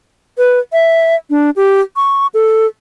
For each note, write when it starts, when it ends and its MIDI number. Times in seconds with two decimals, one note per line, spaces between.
0.38 0.59 71
0.73 1.16 76
1.30 1.50 62
1.56 1.81 67
1.96 2.27 85
2.34 2.67 69